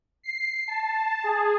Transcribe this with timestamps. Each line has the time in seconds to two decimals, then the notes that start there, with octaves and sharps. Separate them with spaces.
0.23 C7
0.68 A5
1.24 G#4